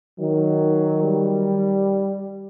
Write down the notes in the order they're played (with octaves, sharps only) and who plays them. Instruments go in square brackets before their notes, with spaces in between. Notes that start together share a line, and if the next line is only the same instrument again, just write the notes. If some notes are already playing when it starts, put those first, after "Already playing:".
[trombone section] D#3 [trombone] F#3
[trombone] G3